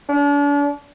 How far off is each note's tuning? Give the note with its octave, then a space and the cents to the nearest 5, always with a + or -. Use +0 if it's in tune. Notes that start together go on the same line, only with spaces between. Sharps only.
D4 -40